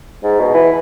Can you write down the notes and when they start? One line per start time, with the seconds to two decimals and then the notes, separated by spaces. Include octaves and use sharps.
0.24 G#2
0.40 B2
0.54 E3